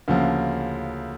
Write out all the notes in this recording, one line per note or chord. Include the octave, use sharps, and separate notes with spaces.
D2 C#3 F3 A#3